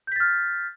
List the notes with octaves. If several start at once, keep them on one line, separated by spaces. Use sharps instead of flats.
F6 G6 A6 B6